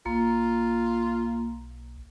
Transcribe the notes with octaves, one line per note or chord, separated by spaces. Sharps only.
B1 A#3 F4